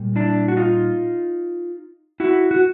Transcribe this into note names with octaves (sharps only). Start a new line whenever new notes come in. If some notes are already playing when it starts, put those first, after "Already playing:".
Already playing: A#2 G3
D4 E4
F#4
D#4 F4
E4 F#4
F#4